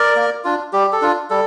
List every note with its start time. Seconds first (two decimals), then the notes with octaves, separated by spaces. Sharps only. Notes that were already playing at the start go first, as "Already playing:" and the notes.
Already playing: A#4 D5
0.16 A#3
0.44 D4 F4
0.73 G3 G4
0.92 A4
1.02 D4 F4
1.30 G3 A4